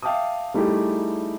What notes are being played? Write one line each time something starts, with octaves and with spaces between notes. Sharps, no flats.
E5 F5 G5 A5 D6 D#6
G3 A3 D#4 E4 G4 G#4